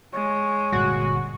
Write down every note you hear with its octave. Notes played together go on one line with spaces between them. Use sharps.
G#3 C#5
G1 A#2 G3 F#4